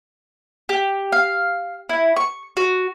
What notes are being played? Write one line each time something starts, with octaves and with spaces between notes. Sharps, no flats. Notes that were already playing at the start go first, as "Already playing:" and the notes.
G4
F5
E4
C#6
F#4